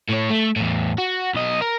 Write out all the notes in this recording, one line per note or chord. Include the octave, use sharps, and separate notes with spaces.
A2 C#5
A3
E2 A2
F#4
B1 D#5
A#4